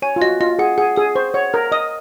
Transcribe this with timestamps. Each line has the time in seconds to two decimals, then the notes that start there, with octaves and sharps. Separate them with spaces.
0.02 C#5 G#5
0.16 F4
0.21 F#4 D#5
0.40 F4 D#5
0.59 G#4 F#5
0.78 G#4 F#5
0.96 G#4 D#6
1.15 C5 C#6
1.34 C#5 F#5
1.53 A#4 F6
1.72 D#5 D#6